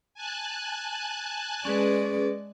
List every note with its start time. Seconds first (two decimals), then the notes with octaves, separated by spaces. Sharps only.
0.14 G#5 A5 F#6
1.65 G#3 C#4 G#4 B4 D5